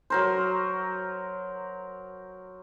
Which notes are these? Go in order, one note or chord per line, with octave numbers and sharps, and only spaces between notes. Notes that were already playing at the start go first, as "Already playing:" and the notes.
F#3 A#4 C5